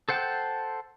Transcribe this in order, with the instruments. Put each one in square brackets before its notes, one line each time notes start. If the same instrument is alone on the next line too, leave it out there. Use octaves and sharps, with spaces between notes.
[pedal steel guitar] A4 C5 F#5 G5 A5